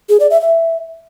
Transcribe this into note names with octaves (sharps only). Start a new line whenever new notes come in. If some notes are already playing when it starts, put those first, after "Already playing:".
G#4
D5
E5
E5